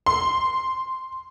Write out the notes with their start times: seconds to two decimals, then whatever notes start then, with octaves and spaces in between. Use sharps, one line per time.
0.06 C6